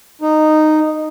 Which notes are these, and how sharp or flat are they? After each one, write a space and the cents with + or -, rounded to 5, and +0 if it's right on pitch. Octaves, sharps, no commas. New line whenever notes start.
D#4 -10